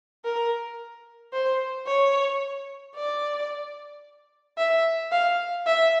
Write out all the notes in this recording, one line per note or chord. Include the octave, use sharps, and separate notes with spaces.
A#4
C5
C#5
D5
E5
F5
E5